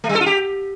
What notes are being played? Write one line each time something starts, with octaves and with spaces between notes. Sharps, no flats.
A3
G3
A4
F4
G4